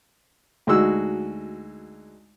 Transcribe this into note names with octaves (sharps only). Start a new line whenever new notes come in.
D2 G#3 D#4 F#4 E6